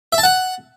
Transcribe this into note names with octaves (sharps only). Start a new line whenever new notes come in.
E5
A5
F#5